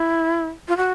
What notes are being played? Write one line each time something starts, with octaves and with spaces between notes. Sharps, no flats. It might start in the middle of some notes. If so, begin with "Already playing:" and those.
Already playing: E4
F4
F#4